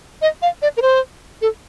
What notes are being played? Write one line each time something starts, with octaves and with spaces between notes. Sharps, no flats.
D#5
F5
D5
A#4
C5
A4